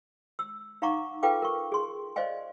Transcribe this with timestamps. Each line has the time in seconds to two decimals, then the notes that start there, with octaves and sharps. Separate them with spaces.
0.39 E6
0.82 D#4 F5 F#5 A#5 C#6 D6
1.23 F4 A4 B4 F5 G5 D6
1.42 A#4 C#6
1.72 G#4 C6
2.16 C5 D5 D#5 F5 G#5